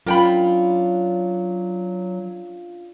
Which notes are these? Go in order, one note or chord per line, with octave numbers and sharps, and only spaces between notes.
F#3 C#4 D4 F4 A#4 G5 B5